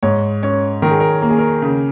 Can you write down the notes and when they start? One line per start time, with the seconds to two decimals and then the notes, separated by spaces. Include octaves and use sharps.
0.03 G#2 C#5
0.42 C#4 C#5
0.82 D#3 A#4
0.91 G#4
1.00 A#4
1.22 A#3 A#4
1.30 G#4
1.38 A#4
1.62 C#3